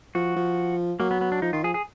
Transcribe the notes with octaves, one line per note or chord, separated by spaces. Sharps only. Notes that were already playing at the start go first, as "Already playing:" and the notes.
F3 F#4
F3
F#3 A#3
B3
B3
D4
F3 D#4
D#3 F4
F3 G#4
G#4